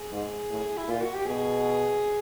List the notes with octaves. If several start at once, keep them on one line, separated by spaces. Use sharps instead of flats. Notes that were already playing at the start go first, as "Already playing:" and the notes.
Already playing: G#4
G#2
A2
E4
A#2 F4
F#4
G4
B2 G#4